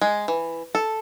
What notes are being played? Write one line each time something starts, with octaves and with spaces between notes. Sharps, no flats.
G#3
E3
A4